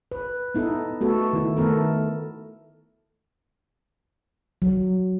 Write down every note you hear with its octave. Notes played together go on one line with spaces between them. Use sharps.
B4
B3 D#4 E4 A4
A3 B3 F#4 A4
D#3 E4
D#3 A3 B3 A4 A#4
F#3